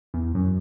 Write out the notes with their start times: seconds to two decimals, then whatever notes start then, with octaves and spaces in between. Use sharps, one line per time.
0.14 E2
0.35 F#2